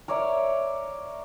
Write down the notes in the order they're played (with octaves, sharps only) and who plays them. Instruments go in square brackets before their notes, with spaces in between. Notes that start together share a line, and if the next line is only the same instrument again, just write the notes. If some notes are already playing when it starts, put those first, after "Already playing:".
[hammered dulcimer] A#4 C#5 D5 E5